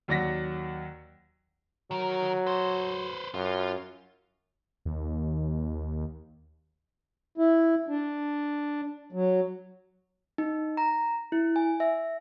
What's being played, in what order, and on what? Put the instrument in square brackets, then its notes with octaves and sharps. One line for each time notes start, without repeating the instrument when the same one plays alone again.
[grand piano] D#2 F#3 D5 F#5 A#6 B6
[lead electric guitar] D#3 A#4 [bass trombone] F#3
[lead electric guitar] B4 C5
[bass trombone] F#2 [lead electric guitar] F4
[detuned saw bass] D#2
[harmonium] E4
D4
F#3
[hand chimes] D#4
A#5
E4
G#5
E5